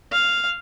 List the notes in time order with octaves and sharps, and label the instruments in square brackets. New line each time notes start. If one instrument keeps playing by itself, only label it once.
[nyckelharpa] F5